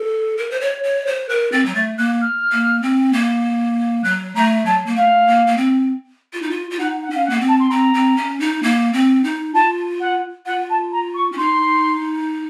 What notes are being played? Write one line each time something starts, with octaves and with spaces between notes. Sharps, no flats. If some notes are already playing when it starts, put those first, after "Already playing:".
Already playing: A4
A#4
C5
C#5
C#5
C5
A#4 F#6
C4 A6
F#3
A3 A6
A#3 F#6
F6
A#3
C4
A#3
F#3 F#6
A3 A#5
F#3 A5
A#3
A3 F5
A#3
A#3
C4
F4
D#4
F4
F4
D#4 F#5
F#5
C#4 F5
F#5
A#3
C4
A5
C6
C4 A#5
C4
C#4
D#4
A#3
C4
D#4
F4 A5
F#5
F4 F#5
A5
A#5
C#6
C#4
D#4 C6